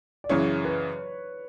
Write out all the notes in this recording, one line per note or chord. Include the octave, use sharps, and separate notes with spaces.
D5
F#2 C#3 E3 C#5
B4